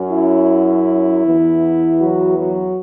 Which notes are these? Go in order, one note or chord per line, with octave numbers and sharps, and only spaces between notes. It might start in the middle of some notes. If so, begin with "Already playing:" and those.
Already playing: F#2 F#3 C#4
E4
E2 E3 B3
F#3 F#4
F#3 F#4